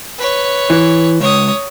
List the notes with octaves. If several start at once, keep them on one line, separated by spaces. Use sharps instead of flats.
B4 C#5
E3
C#2 C#5 D#6